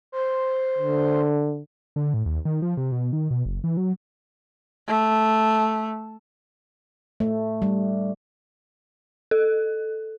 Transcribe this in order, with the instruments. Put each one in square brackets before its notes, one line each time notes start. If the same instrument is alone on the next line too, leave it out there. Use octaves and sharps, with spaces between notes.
[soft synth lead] C5
[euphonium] D3
[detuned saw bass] D3
A2
D#2
D#3
F3
C3
B2
D#3
B2
F#1
E3
F#3
[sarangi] A3
[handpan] A3
G3
[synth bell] A4